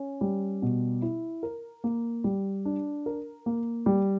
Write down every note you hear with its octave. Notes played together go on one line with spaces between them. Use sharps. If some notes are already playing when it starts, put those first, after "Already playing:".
Already playing: C#4
G3
B2
E4
A#4
A#3
G3
D4
A#4
A#3
G3